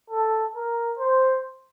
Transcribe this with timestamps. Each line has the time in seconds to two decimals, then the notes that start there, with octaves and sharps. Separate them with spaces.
0.10 A4
0.55 A#4
0.99 C5